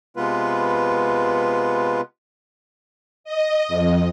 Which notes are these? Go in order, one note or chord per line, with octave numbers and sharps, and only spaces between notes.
C3 G#3 B3 F4 B4
D#5
F2